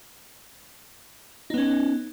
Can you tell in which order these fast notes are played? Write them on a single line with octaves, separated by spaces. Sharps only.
D#4 B3 C#4